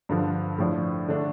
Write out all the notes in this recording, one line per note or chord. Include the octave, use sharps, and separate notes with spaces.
G2 D3 F3
A2 F3 D4
D3 A3 D4